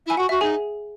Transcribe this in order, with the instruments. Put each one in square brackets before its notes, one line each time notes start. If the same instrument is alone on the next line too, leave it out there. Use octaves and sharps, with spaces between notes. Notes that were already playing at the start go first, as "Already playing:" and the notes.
[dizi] E4 [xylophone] G#5
[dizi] F#4 [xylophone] F#5
[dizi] F#4 [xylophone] E5
[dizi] D#4 [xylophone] G#4 G#5